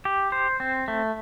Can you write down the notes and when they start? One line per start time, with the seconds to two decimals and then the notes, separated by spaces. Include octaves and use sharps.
0.05 G4
0.32 C5
0.60 C4
0.88 A3